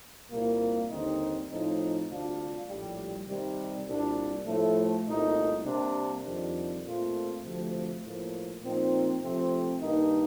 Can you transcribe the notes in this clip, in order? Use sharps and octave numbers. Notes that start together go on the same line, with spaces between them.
C2 A#2 G3 A#3
D#2 D3 G3 C4 D#4
A2 F3 C4 D#4
D2 C3 G3 D4 F4
A#1 A2 G3
C3 D#3 G3
C2 A#2 G3 D4
A2 F3 A3
C2 A#2 A3 D#4
C3 G3 A#3 D4
F2 C3 D#3 G3 D4
A#2 A3 C4 F4
D2 C3 F3 A3
A2 F3 A#3
A#2 F3 C4 D#4
C3 F3 A3 C4
G2 D#3 A#3 D#4